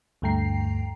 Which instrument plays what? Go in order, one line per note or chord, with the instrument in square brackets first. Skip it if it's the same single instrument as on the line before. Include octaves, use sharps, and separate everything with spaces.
[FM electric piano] D2 G2 A3 G5 A#5 C7